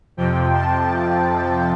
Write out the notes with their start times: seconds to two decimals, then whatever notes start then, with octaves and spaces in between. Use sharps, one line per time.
0.17 F2 C3 F3 G5
0.54 A5